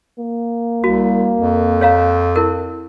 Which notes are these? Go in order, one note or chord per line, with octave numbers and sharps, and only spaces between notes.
A#3
C2 F#4
F2
C#5 F5 A#5
E4 A#4